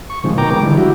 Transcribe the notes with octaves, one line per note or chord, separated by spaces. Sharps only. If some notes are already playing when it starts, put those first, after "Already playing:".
C#6
C3 D#3 F3 G#3
B2 D#3 A#4 G5 A#5 D6
G#3 B3 D6
D3 E3 G3
E4 F#4 G4